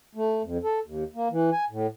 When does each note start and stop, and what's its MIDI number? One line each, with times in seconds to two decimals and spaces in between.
0.15 0.42 57
0.43 0.58 41
0.64 0.79 69
0.86 1.04 39
1.15 1.28 58
1.31 1.50 52
1.52 1.65 80
1.70 1.87 45